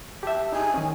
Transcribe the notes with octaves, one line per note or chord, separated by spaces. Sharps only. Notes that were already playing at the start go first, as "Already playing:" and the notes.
G4 E5 A5
D#4 G#5
D#3 C#4